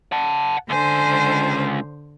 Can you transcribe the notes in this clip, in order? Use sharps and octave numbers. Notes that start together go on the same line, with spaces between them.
F#5 A5
C#2 D3 C5 G#5